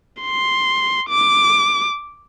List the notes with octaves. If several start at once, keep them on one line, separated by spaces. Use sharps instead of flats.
C6
D6